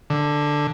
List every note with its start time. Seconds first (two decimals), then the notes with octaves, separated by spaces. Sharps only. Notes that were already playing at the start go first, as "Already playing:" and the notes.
0.10 D3